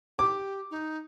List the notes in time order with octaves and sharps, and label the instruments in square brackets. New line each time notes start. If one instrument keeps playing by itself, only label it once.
[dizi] G4 [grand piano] D6
[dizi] D#4